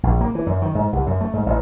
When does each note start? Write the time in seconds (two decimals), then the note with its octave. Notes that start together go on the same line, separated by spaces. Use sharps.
0.03 A#1
0.21 A#3
0.35 E3
0.46 F#2
0.62 D#3
0.75 G#2
0.93 C2
1.06 F#2
1.21 A3
1.33 G#2
1.46 A1